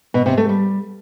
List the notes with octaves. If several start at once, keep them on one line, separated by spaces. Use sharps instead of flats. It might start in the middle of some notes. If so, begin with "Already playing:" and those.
B2
C3
A3
G3